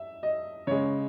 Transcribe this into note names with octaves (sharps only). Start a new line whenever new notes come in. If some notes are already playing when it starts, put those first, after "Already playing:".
Already playing: E5
D#5
C#3 G#3 C#5